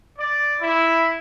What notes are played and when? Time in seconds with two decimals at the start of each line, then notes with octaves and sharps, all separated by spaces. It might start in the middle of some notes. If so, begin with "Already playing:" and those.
0.19 D5
0.61 E4